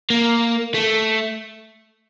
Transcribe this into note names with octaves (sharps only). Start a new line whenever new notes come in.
A#3
A3